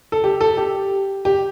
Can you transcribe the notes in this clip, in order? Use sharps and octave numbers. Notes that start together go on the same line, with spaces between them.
A4
G4
A4
G4
G4